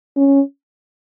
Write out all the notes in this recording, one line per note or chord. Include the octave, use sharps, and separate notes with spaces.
C#4